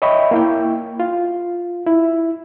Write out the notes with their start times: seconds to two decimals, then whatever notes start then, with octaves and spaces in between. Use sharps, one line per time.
0.02 C#5 D#5 E5 G5 B5 C#6
0.31 A#3 E4 G5
1.00 F4
1.86 E4